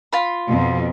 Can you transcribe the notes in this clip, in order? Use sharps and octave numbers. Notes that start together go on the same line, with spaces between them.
F4 B5
F2 B2